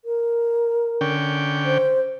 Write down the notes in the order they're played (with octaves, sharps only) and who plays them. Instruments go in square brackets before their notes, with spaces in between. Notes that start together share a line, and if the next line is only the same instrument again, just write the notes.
[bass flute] A#4
[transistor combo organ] D3 C#4 G5
[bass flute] C5